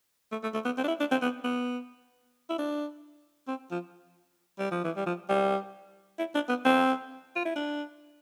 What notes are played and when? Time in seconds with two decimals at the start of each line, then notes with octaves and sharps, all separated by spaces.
0.32 A3
0.43 A3
0.54 A3
0.65 B3
0.78 C4
0.84 D4
0.88 E4
1.00 D4
1.11 C4
1.22 B3
1.44 B3
2.50 E4
2.58 D4
3.48 C4
3.71 F3
4.59 G3
4.71 F3
4.84 E3
4.97 G3
5.06 F3
5.29 G3
6.19 E4
6.35 D4
6.49 B3
6.65 C4
7.36 F4
7.45 E4
7.56 D4